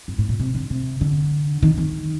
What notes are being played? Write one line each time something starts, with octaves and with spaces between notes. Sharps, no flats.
G2
A2
A#2
C3
D3
C3
D3
D#3
D#3